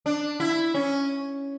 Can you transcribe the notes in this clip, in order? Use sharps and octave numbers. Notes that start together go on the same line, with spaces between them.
D4
E4
C#4